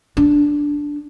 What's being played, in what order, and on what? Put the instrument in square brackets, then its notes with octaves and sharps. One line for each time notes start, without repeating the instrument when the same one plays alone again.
[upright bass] D4